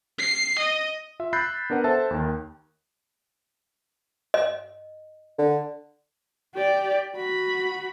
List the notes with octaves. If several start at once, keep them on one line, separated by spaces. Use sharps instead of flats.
C7
D#5
F4 E5
B5 E6 F#6 G6 A6 C7
B3 D4 A#4 B4 F#5
A4 C5 E5 A5
D#2 D#3
D#5
D3
G4 D5
F#4 B5